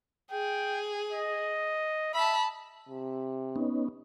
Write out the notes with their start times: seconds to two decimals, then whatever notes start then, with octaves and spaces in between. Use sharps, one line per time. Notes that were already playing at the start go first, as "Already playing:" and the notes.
0.32 G#4 G5
1.12 D#5
2.14 E5 A5 B5
2.89 C3
3.56 B3 C#4 D#4